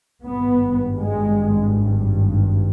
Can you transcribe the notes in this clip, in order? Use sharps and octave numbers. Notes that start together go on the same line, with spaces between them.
G#1 G2 B3
G#3